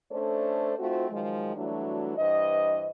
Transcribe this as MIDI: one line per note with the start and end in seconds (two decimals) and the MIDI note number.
0.12 0.73 57
0.12 0.73 61
0.12 0.73 62
0.12 0.73 69
0.12 0.73 72
0.12 0.73 74
0.78 1.07 57
0.78 1.07 60
0.78 1.07 63
0.78 1.07 65
0.78 1.07 66
0.78 1.07 72
1.09 1.55 51
1.09 1.55 53
1.09 1.55 54
1.09 1.55 56
1.56 2.13 52
1.56 2.13 54
1.56 2.13 55
1.56 2.13 57
1.56 2.13 62
1.56 2.13 66
2.17 2.89 43
2.17 2.89 52
2.17 2.89 72
2.17 2.89 75